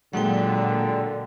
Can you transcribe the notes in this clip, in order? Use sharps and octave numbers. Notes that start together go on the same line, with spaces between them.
A#2 D3 F#3 G#3 F#5 G5